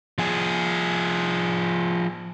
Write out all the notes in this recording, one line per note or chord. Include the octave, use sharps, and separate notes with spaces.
F3 G#4